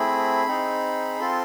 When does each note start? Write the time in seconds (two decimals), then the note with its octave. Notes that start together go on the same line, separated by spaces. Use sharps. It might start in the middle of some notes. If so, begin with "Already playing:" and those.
Already playing: A3 C4 E4 G#4 B5
0.47 C4 D#4 G#4
1.20 C4 F4 A4 C6